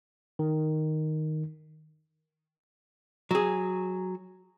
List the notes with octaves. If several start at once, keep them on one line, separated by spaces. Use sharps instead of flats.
D#3
F#3 G#4